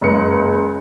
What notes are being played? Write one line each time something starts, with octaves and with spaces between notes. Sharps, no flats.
F#1 C#2 G#3 C#7